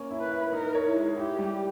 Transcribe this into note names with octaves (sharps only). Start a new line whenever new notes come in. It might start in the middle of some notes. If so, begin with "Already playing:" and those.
Already playing: A#3 C#4
E4
B4
E4
D#4 A#4
C#5
E4
G#3
E4 G4
G3